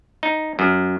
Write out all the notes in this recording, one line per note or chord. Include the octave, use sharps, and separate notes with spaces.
D#4
F#2